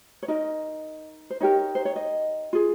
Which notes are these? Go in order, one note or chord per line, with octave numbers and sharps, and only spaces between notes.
C#5
D#4 A#4 D#5
C5
D#4 G4 A#4 C#5
C5
C#5
D#5
F4 G#4